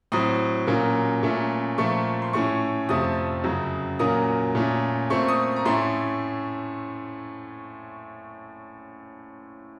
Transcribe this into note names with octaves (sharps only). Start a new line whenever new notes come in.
A2 F#3 C4 D#6
A#2 F#3 A#3 C#4
A#2 A3 C#4
A#2 F3 A3 C#6
C6
A2 A3 C#4 C#6
F2 C3 F3 A3 D#6
F#2 C#3 F#3
A#2 F#3 A#3 C#4 D#6
A#2 A3 C#4
A#2 A3 C4 C#6
D#6
A#5
A2 A3 C#4 C6